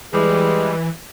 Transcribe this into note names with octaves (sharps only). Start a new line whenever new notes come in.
E3 G3 G#3 B4